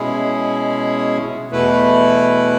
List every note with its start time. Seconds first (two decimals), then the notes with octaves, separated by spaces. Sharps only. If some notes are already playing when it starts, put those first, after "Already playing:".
Already playing: B2 G#3 C#4 E4 G#4
1.51 E2 B2 A3 E4 B4